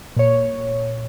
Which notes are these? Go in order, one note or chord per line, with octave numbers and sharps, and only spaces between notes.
A#2 C#5